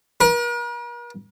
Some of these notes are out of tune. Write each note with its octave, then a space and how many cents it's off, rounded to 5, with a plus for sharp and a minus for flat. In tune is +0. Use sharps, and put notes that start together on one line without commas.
A#4 +45